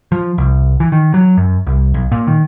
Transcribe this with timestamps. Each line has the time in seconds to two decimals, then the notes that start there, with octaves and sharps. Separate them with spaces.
0.12 F3
0.38 C2
0.80 E3
0.92 D#3
1.14 F#3
1.37 F#2
1.67 C2
1.94 B1
2.12 A#2
2.27 D#3